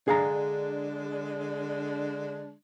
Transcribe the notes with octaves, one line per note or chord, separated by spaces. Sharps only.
D3 G#3 D4 G#4 F5 A#5